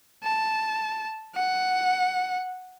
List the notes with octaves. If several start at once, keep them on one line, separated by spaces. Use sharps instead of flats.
A5
F#5